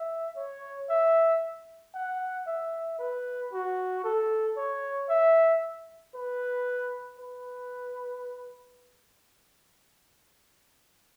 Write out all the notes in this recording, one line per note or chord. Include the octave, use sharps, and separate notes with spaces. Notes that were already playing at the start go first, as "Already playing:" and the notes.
Already playing: E5
C#5
E5
F#5
E5
B4
F#4
A4
C#5
E5
B4
B4